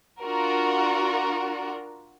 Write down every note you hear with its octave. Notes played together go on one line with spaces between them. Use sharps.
D4 F4 F#4 A#4